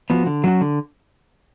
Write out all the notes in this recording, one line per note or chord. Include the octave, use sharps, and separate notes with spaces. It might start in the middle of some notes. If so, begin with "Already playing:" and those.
F3 B3 F#4
D3
F#3 C#4 F#4
D3